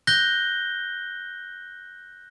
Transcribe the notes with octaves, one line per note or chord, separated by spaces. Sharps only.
F#6 G6 A#6 G7